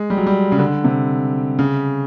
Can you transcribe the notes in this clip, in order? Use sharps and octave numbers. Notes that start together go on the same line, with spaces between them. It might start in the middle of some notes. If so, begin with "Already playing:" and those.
Already playing: G#3
G3
F#3
G3
C#3
D3
C3
C#3